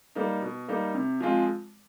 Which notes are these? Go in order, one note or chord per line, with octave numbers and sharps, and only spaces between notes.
G3 A#3 D#4
B2
G3 A#3 D#4
C3
F3 G#3 C4 F4